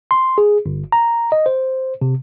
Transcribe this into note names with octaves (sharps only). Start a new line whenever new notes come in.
C6
G#4
G1
A#5
D#5
C5
C3